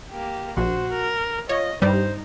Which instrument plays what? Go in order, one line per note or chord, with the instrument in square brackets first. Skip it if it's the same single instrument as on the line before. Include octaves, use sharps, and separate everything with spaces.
[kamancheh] A#3 G4
[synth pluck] A#1 [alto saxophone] F#4 [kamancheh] C5
[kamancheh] A#4
[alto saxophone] F4 [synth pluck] C#5 [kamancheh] D#5
[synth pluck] G2 G3 [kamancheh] D#4 [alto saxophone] C5